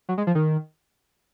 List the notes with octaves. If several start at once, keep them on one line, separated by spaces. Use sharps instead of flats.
F#3
G#3
F3
D#3